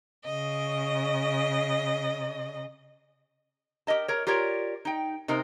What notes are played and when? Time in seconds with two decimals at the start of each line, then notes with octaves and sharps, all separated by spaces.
0.25 C#3 D#5
3.87 G4 A#4 D#5 A5
4.08 A#4 C#5
4.27 F4 G4 A#4 C#5 D5
4.85 D#4 G5
5.28 C3 D#4 A#4 C5